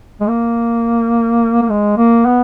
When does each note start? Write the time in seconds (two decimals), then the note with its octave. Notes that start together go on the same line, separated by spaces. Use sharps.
0.20 G#3
0.28 A#3
1.62 A#3
1.69 G#3
1.98 A#3
2.26 B3